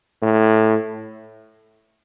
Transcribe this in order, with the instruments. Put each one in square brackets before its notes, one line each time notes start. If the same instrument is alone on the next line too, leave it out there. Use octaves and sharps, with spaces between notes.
[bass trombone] A2